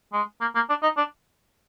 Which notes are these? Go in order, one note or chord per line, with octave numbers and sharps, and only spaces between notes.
G#3
A#3
A#3
D4
D#4
D4